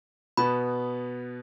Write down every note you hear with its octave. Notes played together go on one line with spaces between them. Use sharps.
B2 B3 B5